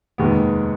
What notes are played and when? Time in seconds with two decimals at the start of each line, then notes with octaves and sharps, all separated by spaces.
0.18 F1 D#2 D#3 G#3 B3